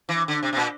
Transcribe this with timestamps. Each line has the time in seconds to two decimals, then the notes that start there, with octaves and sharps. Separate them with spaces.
0.09 E3
0.28 D3
0.43 C3
0.53 C3
0.57 A#2